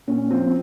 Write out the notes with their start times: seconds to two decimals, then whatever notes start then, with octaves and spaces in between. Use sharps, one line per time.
0.08 A#2 C#4
0.31 F3 C4